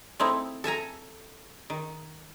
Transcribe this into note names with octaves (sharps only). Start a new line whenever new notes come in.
A3 C4 D#4 E4
A4 E5 G#5 A#5
D#3